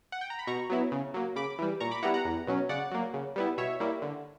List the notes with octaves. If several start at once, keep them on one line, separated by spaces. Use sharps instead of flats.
F#5
G5
A#5
B5
B2 A#5 C#6
F#3 B3 E4
C#3
F#3 A#3
C#3 B5 D6
E3 G3
A#2 A#5 C#6
B5 D6
G3 B3 E4 F#5 A#5
F#5 A#5
E2
B2 F#3 C#4
C#3 D5 F#5
F#3 A#3
C#3
G3 B3 E4
B2 C#5 E5
G3 A#3 E4
D3